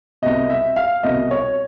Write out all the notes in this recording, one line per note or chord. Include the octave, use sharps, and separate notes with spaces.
C2 B2 D#5
E5
F5
C2 B2 D#5
C#5